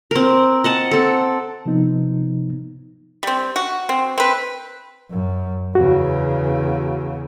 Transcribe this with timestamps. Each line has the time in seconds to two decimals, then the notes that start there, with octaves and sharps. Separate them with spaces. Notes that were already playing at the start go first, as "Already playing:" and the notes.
0.11 C4 A#4
0.64 D#5 F#5 A5
0.91 C4 A4
1.66 C3 F3 B3 D#4
3.23 G3 C4
3.56 F#4
3.89 C4
4.18 C4 B4
5.11 F#2
5.75 E2 C#3 F#4